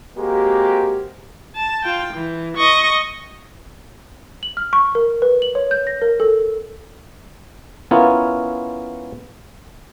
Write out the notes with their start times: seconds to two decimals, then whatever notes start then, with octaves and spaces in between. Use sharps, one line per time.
0.18 G#3 A#3 C4 F#4 G4
1.56 A5
1.85 F4 G5
2.14 E3
2.57 D#5 C#6
4.43 F#7
4.57 F6
4.73 C#6
4.95 A#4
5.22 B4
5.42 F#7
5.55 C#5
5.71 G6
5.87 A#6
6.02 A#4
6.20 A4
7.91 B3 C#4 E4 F4 A#4